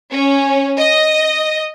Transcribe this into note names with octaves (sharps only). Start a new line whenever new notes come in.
C#4
D#5